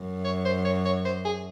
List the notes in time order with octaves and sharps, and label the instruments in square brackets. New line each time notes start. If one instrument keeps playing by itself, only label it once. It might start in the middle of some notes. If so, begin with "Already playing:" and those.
Already playing: [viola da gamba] F#2
[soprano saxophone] C#5
C5
C#5
C#5
C5
G#4